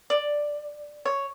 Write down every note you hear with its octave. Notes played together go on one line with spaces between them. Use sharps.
D5
C#5